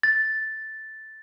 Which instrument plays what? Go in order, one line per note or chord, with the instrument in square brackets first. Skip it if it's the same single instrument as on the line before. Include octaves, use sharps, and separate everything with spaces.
[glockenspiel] A6